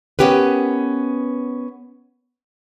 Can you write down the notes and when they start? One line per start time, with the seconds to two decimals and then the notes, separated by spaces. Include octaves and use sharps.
0.19 B3 C#4 G4 A#4 B4